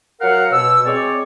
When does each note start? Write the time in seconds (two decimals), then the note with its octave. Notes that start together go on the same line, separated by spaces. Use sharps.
0.20 F#3 A#4 F5 F#5
0.51 B2 E6
0.85 G#3 C4 C#5 D5